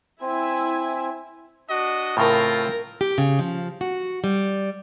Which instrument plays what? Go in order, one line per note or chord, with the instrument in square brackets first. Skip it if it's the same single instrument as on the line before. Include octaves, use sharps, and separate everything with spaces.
[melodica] C4 [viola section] E4 E5 G#5
[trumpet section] D4 F#4 D#5
[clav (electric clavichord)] A2 C#3 [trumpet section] C4 F4 A4 [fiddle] A#4
[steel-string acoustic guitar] G4
C#3
F3
F#4
G3